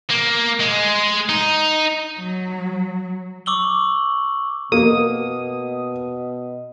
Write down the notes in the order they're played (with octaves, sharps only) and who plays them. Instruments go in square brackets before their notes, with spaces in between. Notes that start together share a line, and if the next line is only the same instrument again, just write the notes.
[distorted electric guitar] A#3
G#3
D#4
[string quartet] F#3
[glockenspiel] C#6 D6 E6 F#7 G7
[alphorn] B2 [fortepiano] A#3 [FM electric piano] D#6